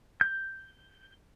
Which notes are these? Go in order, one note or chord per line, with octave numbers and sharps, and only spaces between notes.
G6